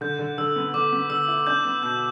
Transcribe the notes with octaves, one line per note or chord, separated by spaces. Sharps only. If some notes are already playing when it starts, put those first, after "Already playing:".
D3 G6
D3
D3 E6
B3
D3 D6
B3
D3 E6
E4
D4 G6
B3
B2 G6